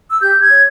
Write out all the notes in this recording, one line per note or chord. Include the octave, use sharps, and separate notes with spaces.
E6
G4 G6
G#6
C#5